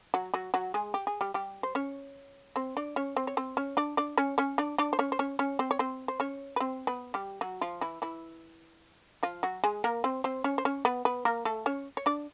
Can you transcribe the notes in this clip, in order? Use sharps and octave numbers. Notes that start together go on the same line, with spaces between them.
F#3 F#4
F#3 F#4
F#3 F#4
G#3 G#4
G4
G#4
G3 G4
G3 G4
C5
C#4 C#5
C4 C5
D4 D5
C#4 C#5
C4 C5
C#5
C4 C5
C#4 C#5
D4 D5
D4 D5
C#4 C#5
C#4 C#5
D4 D5
D4 D5
C5
C#4 C#5
C5
C#4 C#5
C#4 C#5
C4 C5
C#5
C4 C5
C5
C#4 C#5
B4
C4 C5
B3 B4
G3 G4
F#3 F#4
F3 F4
E3 E4
E3 E4
F3 F4
F#3 F#4
G#3 G#4
A#3 A#4
C4 C5
C4 C5
C#4 C#5
C5
C#4 C#5
B3 B4
B3 B4
A#3 A#4
A3 A4
C#4 C#5
C#5
D4 D5